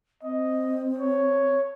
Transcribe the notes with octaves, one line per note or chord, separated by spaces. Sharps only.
C4 D#5
C#5